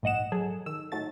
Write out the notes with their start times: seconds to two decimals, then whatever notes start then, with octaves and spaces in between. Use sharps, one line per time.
0.03 A#1 G#2 D#5 F#5 E7
0.32 F#3 G#4 A4
0.66 D#3 E6
0.92 A2 F#3 A3 D#4 A6